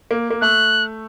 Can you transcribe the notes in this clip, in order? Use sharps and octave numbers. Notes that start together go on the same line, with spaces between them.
A#3
A#3
A3 F#6